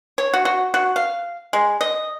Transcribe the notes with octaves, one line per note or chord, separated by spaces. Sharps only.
C#5
F#4
F#4
F#4
F5
G#3
D#5